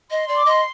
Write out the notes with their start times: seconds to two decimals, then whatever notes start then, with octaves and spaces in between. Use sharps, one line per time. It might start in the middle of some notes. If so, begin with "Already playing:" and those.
0.11 D#5 C6
0.28 D5
0.35 D6
0.46 D#5 C6